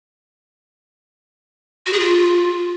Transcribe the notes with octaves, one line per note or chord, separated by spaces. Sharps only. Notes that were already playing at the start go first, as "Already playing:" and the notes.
F#4
G#4
F4